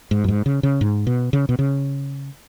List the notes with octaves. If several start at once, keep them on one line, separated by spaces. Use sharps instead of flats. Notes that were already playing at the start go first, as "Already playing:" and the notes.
G#2
F#2
G#2
C#3
C#3
G#2
B2
C#3
B2
C#3